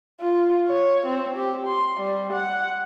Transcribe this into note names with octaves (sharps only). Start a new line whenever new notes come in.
F4
C#5
C4
G4
C6
G3
F#5